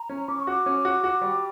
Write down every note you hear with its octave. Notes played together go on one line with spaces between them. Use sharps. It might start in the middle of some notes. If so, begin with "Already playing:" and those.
Already playing: A#5
C#4
C#4 D6
C#6
F#4 D6
C#4
F#4
F#4
G3